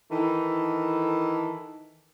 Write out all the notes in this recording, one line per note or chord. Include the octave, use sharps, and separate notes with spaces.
D#3 E3 A4